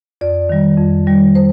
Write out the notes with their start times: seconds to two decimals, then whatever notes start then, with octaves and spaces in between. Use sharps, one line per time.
0.21 F2 D5
0.50 D#3 G3
0.78 F2
1.07 D#3 G3
1.35 C5